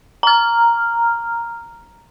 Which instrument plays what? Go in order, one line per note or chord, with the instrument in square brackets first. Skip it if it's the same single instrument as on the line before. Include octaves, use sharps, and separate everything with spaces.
[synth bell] A#5 F6